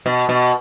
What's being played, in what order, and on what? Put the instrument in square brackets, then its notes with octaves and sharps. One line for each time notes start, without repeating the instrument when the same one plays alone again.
[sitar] B2
B2